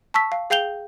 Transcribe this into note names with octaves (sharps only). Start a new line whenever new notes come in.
A5 C#6 E6 B6
F5
G#4 F5 G5 G6 F7 G7